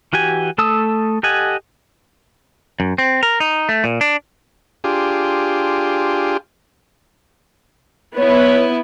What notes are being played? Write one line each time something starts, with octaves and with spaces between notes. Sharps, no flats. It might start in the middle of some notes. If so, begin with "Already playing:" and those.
E3 F#4 G4 G#5
A3 A4 A5 D#6 E6
G4 A4 D#5 F#5 G#5
F#2
C4
A#4
D#4
A3
A#2
D4
D4 F4 G4 G#4 C6
B3 E4 B4 C#5